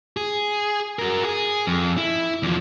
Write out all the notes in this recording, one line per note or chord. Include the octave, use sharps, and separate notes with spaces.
G#4
F#4 A#4
G#4
F2
E4
E2 F3